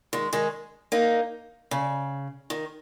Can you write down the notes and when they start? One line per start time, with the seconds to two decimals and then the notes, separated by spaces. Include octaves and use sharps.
0.13 D#3 G#3
0.33 D#3 G#3
0.92 A#3 D#4
1.71 C#3
2.50 D#3